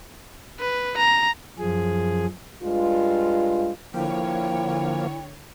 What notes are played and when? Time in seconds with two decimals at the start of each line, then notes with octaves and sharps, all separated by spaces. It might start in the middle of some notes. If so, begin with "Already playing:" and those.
0.60 B4
0.97 A#5
1.59 F#2 F3 G#4
2.62 G2 G#3 F4
3.94 D3 F3 A#3 E4 C#5 G5